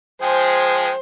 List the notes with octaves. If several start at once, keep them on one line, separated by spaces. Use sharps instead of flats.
F3 G#3 G#4 C5 G5